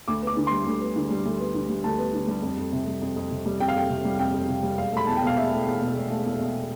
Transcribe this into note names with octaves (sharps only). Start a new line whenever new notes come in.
D2 D6
B3 D6
D3
G3 C6
D2
B3
D3
G3
D2
B3
D3
G3
D2 A5
B3
D3
G3
F2
F2
C3
G3
F2
F2
C3
G3
F2 G5
F5
F2 G5
C3
G3
F2 G5
F2
C3
G3
E1 F5
A3 B5
E2 A5
G5
B2 F5
E1 E5
A3
E2
B2
E1
A3
E2
B2